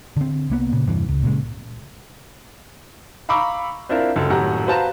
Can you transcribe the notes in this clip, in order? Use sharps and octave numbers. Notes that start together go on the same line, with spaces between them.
D3 C4
C2 A#3 B3
A#2 C#3
E2 G2 C3 E3
C#2
A#2 C#3 G#3
F5 A#5 B5 C#6 D6 E6
C4 D4 E4 F4 A#4
C#2 F#2 A4
D#1 F#2 A2 G4 F#5 A#5
F#4 B4 C5 F5 A5 A#5